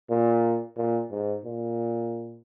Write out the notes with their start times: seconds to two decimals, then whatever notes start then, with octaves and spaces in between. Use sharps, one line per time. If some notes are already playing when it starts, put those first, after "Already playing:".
0.10 A#2
0.77 A#2
1.11 G#2
1.44 A#2